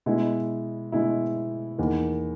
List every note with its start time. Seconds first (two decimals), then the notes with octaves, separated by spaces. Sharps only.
0.06 B2 G#3 B3 E4
0.92 B2 G#3 B3 E4
1.78 E2 D#3 A#3